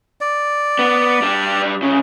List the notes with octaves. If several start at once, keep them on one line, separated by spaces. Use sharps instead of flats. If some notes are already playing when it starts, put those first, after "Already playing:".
D5
B3
G3 D4
C2 C#3